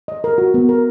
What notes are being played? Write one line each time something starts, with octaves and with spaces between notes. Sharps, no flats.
D#5
A#4
F#4
B3
A#4